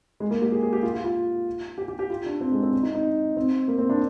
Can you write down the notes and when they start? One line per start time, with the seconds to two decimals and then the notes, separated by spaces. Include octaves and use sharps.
0.20 G#3
0.31 A#3
0.42 G4
0.52 G#4
0.63 G#4
0.73 G4
0.83 F4
0.94 F4
1.04 F4
1.78 G4
1.88 G4
1.99 G4
2.10 F4
2.26 D4
2.41 C4
2.52 G#3
2.63 C4
2.73 C4
2.83 D#4
2.95 D#4
3.37 C4
3.68 A#3
3.78 C4
3.90 D4